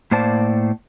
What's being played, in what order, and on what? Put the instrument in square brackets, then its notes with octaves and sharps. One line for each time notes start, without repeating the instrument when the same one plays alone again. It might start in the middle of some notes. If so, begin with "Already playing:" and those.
[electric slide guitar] A2 A#3 C5 D5 A5